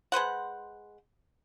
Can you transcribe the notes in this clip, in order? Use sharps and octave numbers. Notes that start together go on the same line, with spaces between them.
G#3 B4 C5 F#5